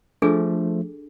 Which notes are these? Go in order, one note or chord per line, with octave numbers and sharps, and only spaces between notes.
F3 A3 D4 G#4 A4